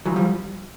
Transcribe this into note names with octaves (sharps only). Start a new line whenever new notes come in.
E3 F#3
F3 G3